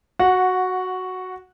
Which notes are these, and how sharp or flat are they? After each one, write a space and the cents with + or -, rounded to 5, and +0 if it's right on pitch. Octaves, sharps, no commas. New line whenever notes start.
F#4 +0 F#5 -15